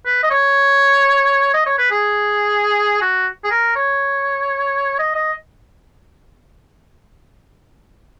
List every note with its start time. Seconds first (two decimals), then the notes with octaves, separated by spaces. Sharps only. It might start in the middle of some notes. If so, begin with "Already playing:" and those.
0.05 B4
0.23 D#5
0.31 C#5
1.54 D#5
1.66 C#5
1.78 B4
1.91 G#4
3.01 F#4
3.44 G#4
3.51 A#4
3.76 C#5
4.99 D#5
5.15 D#5